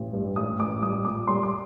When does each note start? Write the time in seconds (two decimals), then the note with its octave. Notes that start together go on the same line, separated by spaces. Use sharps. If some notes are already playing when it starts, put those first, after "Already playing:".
Already playing: A1
0.13 G2
0.36 A1 D#6
0.59 A1 D6
0.82 G3 D#6
1.05 A#1 D6
1.28 G3 C6
1.43 D6